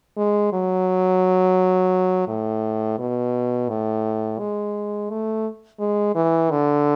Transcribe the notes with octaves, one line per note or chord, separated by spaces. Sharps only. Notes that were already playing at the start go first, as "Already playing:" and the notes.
G#3
F#3
A2
B2
A2
G#3
A3
G#3
E3
D3